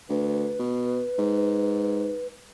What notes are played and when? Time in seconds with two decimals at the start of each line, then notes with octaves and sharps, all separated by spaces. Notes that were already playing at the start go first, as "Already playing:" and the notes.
0.10 D2 B4
0.59 B2
1.18 G#2